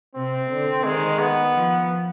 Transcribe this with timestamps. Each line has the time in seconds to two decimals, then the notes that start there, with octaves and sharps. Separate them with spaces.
0.15 C3 C4
0.50 D3
0.84 D#3 G#3
1.19 B3
1.54 F3